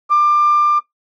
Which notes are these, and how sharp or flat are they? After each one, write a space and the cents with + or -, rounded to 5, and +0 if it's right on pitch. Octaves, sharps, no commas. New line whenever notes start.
D6 +25